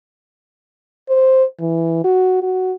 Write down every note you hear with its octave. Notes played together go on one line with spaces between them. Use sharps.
C5
E3
F#4
F#4